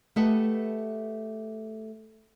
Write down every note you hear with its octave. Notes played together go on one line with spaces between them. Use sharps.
A3 G4 B4 D#5 E5 F#5